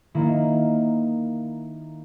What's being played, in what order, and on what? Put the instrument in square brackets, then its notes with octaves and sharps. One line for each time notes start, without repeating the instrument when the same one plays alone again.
[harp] D#3 A#3 E4